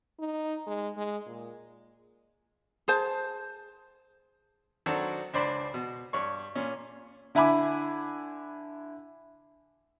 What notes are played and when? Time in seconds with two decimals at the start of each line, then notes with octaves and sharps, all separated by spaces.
0.19 D#4
0.67 G#3
0.97 G#3
1.26 A#2
2.88 G#4 C5 A5
4.86 D#3 F#3 C4 D4 F#4 A4
5.34 C#2 D4 C5 D5 B5
5.74 B2
6.13 G2 C#5 C#6
6.55 A#2 C#4
7.35 D3 E4 G#5 B5 D6